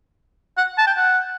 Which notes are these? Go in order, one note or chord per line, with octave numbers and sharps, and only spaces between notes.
F#5
A5
G5
F#5